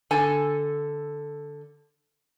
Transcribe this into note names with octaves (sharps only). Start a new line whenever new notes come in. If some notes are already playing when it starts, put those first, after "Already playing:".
D3 A4 G#5